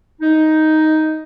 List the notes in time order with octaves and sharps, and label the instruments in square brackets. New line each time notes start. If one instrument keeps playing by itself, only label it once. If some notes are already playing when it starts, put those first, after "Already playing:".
[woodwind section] D#4